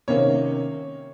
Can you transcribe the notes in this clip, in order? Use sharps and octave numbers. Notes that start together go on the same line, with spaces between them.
C3 D#3 A#3 C#4 C#5